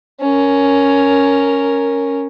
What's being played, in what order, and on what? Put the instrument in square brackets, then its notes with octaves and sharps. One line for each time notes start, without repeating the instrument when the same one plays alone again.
[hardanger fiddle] C#4 A#4